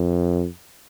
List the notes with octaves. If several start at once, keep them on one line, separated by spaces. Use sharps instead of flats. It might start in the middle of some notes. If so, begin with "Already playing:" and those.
Already playing: F2